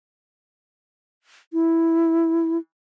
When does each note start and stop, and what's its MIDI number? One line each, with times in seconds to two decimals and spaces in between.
1.53 2.58 64